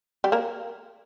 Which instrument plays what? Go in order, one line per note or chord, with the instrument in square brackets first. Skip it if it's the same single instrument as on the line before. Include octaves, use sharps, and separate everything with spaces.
[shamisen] G3 G4
A#3 A#4